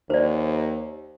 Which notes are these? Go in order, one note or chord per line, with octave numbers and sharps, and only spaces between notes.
D#2 C5 D5